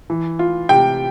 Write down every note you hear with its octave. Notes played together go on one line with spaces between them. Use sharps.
E3
F4
C3 G5